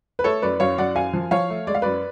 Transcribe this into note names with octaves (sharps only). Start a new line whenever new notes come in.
B4
A3 A4 C#5
F#2 B4 D5
F#2 C#5 F5
F#2 D5 F#5
F#2 F5 G#5
F3
F3 C#5 F5
A3
G#3 D5
F5
F#2 B4 D5